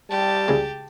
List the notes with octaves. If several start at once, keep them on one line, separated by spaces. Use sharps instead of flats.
G3 G4 A5
C#2 G#3